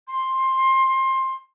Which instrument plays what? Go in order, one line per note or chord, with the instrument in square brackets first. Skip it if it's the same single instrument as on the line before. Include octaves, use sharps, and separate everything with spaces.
[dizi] C6